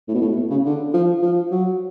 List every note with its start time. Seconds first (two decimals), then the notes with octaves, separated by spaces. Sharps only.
0.08 A2
0.14 B2
0.21 A2
0.36 B2
0.50 C#3
0.65 D3
0.94 F3
1.22 F3
1.51 F#3